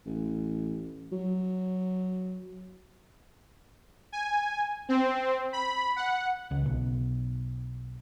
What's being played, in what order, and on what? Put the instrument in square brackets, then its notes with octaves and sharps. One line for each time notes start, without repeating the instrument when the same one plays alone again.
[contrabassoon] A1
F#3
[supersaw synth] G#5
C4
B5
F#5
[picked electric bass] C#2
B1